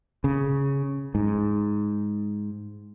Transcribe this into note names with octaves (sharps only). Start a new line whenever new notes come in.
C#3
G#2